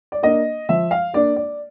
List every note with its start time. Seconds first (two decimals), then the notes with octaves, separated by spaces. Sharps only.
0.12 D5
0.23 A#3 D4 D#5
0.69 F3 E5
0.91 F5
1.13 A#3 D4 D5
1.36 D5